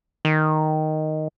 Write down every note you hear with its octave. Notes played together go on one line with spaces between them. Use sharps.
D#3